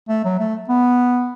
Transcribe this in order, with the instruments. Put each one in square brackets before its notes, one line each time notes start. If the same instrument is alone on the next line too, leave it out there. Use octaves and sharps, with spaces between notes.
[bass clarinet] A3
F#3
A3
B3